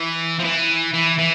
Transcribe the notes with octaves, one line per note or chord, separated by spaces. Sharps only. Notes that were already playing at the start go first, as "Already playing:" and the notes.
Already playing: E3
F3
E3
E3
E3